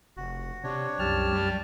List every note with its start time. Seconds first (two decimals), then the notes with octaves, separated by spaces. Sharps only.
0.17 F1 F#4
0.64 C3 D4 C#5
0.99 C2 F#2 G4 A5 F6
1.33 G3